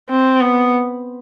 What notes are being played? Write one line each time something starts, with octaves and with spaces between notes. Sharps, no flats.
C4
B3